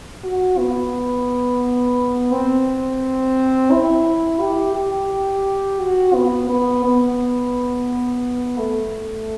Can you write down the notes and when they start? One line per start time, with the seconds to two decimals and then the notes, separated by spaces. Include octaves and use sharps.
0.24 F#4
0.58 B3
2.32 C4
3.71 E4
4.41 G4
4.76 G4
5.80 F#4
6.14 B3
6.49 B3
6.84 B3
8.58 A3